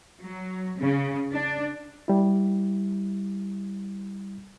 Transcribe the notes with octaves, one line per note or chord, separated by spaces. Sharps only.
F#3
C#3
D4
G3 E4